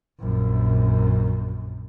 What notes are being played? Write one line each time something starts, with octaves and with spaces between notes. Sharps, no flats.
A#1 F#2